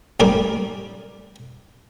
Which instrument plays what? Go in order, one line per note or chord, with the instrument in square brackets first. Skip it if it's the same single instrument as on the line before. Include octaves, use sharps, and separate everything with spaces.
[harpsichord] A1 D#2 G3 G#4 A#4 D6